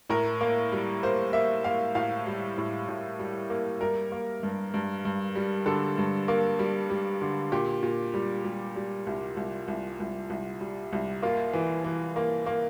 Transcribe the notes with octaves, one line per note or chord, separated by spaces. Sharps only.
A2 A#4
A#3
G3
A#3 C5
A#3 E5
A#3 F5
A2 F5
G3
A2
A2
G3
A#3
G3 A#4
A#3
G2
G2
G2
G3
D3 A4
G2
A#3
G3
G3
D3
A#2 G4
A#2
G3
G3
G3
C2
C2
C2
C2
C2
G3
C2
A#3 F4
E3
E3
A#3
A#3